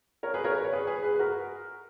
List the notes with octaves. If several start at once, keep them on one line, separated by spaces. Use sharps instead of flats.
A#4 C#5
G#4 B4
A#4 C#5
B4
C#5
G#4 B4
G#4 B4
G#4 B4
B4
F#4 A#4